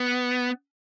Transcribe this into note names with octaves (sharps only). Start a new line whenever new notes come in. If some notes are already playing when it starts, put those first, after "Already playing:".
Already playing: B3